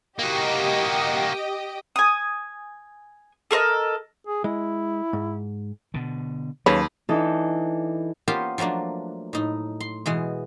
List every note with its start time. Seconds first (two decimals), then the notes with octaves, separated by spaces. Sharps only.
0.19 A#3 F#4 G4 D#5
1.96 G#5 D#6
3.51 A4 A#4 C5 D#5
4.27 G#4
4.44 G#3 E4
5.13 G#2
5.94 B2 D3
6.66 D#2 C#3 F#3 B4 C#5 B5
7.09 E3 D4 D#4 A4
8.28 B3 C#4 F4 G4 A#4 C5
8.58 F3 F#3 A3 A#3 D4
9.33 A2 D#4
9.80 C6
10.06 B2 E3 G#3